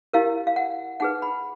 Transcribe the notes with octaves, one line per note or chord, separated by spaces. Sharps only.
E4 G4 A#4 F5
F5
F#5
D#4 G#4 B4 F#5
B5